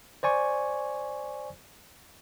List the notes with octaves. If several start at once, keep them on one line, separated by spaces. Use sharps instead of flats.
C5 D5 G#5 C#6